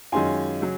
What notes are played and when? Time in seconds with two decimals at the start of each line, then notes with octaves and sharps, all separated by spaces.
0.12 F#2 D#3 G#3 C#4 F4 G#5 C6
0.61 C#3 F#3